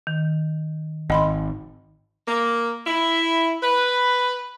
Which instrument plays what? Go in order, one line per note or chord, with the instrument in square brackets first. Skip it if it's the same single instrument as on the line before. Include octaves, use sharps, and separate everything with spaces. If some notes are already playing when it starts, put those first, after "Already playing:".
[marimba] D#3
[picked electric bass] G#1 [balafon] D#5 B5 C6
[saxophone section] A#3
E4
B4